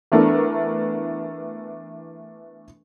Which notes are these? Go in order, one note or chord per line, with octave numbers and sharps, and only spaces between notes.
E3 A3 B3 D4 A4 A#4